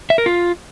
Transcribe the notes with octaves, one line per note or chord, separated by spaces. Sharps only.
E5
A#4
F4